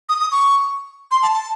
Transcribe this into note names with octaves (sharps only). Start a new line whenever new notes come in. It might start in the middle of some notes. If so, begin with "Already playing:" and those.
D#6
D#6
C#6
C6
A5
A5